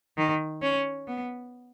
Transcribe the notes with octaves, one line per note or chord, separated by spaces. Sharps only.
D#3
C#4
B3